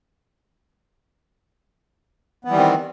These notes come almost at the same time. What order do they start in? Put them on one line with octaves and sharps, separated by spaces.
B3 E3 G3 D#3 C4